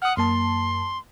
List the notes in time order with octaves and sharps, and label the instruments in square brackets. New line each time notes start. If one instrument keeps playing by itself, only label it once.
[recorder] F#5 [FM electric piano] D#6 F6
[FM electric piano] F#2 A#3 A5 [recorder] C6